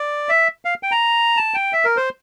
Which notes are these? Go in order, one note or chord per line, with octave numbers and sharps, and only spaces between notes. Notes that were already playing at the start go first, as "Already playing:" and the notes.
Already playing: D5
E5
F5
G5
A#5
A5
G5
E5
A#4
C5